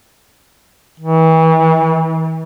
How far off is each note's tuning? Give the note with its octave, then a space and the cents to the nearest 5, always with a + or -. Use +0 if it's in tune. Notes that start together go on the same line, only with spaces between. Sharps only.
E3 -35